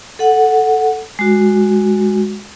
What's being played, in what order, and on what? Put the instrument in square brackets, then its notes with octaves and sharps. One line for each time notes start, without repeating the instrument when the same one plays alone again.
[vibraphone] A4 F#5
G#3 F#4